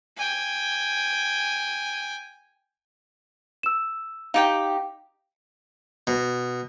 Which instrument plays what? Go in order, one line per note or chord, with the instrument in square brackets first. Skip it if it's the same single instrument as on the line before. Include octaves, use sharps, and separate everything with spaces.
[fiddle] G5 G#5
[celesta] E6 E7
[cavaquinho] D#4 G4 G5 [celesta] F5
[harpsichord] B2